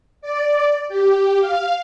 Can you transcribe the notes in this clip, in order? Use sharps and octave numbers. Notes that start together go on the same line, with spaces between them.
D5
G4
F5